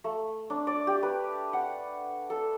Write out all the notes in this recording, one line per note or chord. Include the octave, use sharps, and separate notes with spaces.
A3
D4
D5
G4
B4
F#5
A4